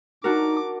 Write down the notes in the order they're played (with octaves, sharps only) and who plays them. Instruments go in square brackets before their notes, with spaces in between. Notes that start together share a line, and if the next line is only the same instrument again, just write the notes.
[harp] D4 F#4 A#4 [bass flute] D#4 [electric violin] D6